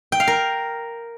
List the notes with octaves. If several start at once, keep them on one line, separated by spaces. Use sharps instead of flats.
G5
F5
A#4